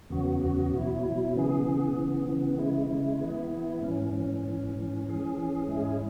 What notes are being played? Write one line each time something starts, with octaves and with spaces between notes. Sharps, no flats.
E2 C#3 F#3 B3 F#4
E2 C#3 F#3 B3 F#4
B2 F#3 E4
B2 F#3 E4
C#3 E3 B3 G#4
C#3 E3 B3 G#4
C#3 E3 B3
C#3 E3 B3
C#3 G#3 E4
C#3 G#3 E4
E3 B3 E4
E3 B3 E4
G#2 E3 C#4
G#2 E3 C#4
G#2 E3 C#4
G#2 E3 C#4
E3 C#4 G#4
E3 C#4 G#4
G#2 G#3 C#4 E4 G#4